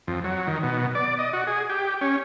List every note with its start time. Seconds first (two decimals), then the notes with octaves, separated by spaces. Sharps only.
0.08 F2
0.24 F#3
0.47 D#3
0.63 B2
0.95 D5
1.19 D#5
1.33 F#4
1.47 G#4
1.70 G4
2.01 C#4